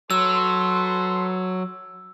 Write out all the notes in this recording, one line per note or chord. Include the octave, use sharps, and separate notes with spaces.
F#3 A4 B4 C6 E6